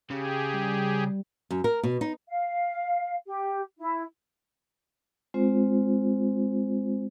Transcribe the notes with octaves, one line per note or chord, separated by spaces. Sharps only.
C#3 G4 G#4
G3
F#2
A#4
B2
D#4
F5
G4
E4
G#3 C4 F4 C5